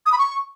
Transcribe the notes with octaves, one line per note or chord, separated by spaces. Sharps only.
D#6
B5
C#6